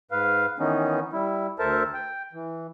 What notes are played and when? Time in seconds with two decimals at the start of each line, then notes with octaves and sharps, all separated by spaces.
0.11 G#2 B4 F5
0.59 D#3 E3 B3 C#4 D#4
1.13 G3 E4
1.59 D2 A4 A#4 C5 E5 A5
1.94 G5
2.33 E3